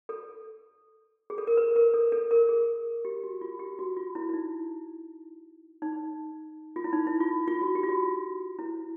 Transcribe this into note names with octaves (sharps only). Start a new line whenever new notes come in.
A4
G#4
A4
A#4
B4
A#4
A4
A4
A#4
G#4
G4
F#4
F4
G4
F#4
F4
E4
E4
D#4
D#4
F4
E4
D#4
E4
F4
F4
F#4
G4
F4
F#4
F4
E4